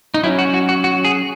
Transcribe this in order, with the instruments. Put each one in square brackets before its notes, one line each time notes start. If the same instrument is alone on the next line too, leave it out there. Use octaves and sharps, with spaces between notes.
[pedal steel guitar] D#4
F#3 C#4 E4
F#4
F#4
F#4
F#4
G#4